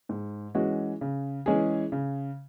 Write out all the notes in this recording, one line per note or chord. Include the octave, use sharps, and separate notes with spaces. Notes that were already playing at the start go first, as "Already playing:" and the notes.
G#2
E3 G#3 C#4 F#4
C#3
E3 G#3 C#4 G#4
C#3